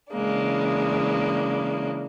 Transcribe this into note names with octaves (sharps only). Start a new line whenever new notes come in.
C#3 E3 G#3 A#3 D4